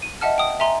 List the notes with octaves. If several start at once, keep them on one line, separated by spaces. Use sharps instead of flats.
D#7
D#5 E5 F#5 A5 F6
G5 D#6
E5 G#5 A#5 C6